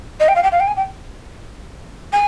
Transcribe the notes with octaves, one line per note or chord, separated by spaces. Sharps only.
D#5
G5
F5
G5
F5
G5
G#5
G5
G#5